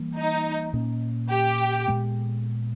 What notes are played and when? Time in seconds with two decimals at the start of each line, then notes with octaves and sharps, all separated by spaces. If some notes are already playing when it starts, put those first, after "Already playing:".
Already playing: E3 G3 A#3
0.17 D#4
0.73 A#2 A#3 C#4
1.30 G4
1.88 A#2 G#3 B3